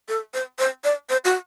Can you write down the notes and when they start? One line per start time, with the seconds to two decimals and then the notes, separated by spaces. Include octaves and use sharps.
0.08 A4
0.34 C5
0.59 C5
0.84 D5
1.09 C5
1.25 F#4